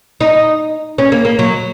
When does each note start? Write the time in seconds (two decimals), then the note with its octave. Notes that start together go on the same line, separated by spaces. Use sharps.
0.21 D#4
0.98 C#4
1.12 A#3
1.25 A#3
1.39 F#3